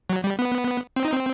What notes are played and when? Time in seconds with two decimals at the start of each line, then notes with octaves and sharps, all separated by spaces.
0.10 F#3
0.24 G3
0.39 B3
0.96 C4
1.05 D#4
1.13 C4